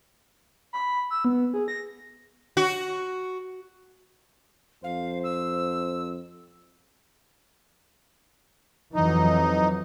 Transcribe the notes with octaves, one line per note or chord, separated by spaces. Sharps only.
B5
E6
B3
G#4
A#6
F#4
F2 C5 F5
E6
F2 E3 F#3 D#4